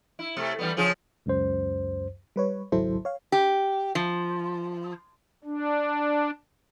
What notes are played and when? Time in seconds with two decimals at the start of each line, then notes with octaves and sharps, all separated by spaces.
0.19 E4
0.37 C3 A3
0.59 E3 G3 B3
0.77 C#3 F3 G#4
1.26 C#2 F#2 C5
2.36 G3 B4 C#5
2.72 G#1 C#2 F#3 E4 A4 C5
3.05 C#5 F5
3.32 G4
3.95 F3
5.44 D4